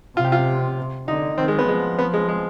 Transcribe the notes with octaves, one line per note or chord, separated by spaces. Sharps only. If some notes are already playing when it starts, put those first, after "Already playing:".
C3 F4
G4
F4
D3 D#4
D#3 C4
G#3
B3
F3 G#3
B3
G#3
G#3